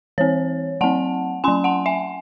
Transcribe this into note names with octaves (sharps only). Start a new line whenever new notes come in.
E3 C4 C#5
F#3 C4 F#5 A5
F#3 C#4 G#5 C6
F#5 A5
E5 G#5